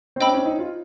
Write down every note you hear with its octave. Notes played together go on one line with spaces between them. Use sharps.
C4
C#4 C5 D#5 G5 B5 E6
D4
C#4
D#4
F4